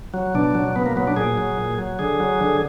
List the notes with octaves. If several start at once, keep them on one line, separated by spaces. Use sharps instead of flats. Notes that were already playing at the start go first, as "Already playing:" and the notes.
F#3
B2 D4
F#3
B2 B3
A#3
F#3 B3
D4
A#2 G#4
F#3
A#2
F#3
D3 G#4
F#3
D3